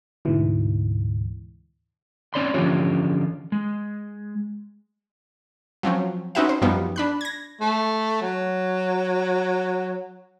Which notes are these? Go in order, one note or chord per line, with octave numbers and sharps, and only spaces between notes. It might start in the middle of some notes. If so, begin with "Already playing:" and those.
D2 G#2 B2 E3
C4 C#4 C#5 D5 B5 C6
D3 E3 F3 C#4 F4 G4
G#3
F3 F#3 C4 C#4
C4 C#4 D#4 F#4 B4 E5
C5
F#2 F3 G3 B3 D#4
D4 B5 F#6
G#6 A#6
A3
F#3